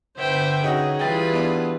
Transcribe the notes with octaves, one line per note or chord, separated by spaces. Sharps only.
G1 D3 B4 C5 E5 G5
D3 C#4 D#4 F#4 G#4
E3 G3 F4 B4 G5 A6
B3 D4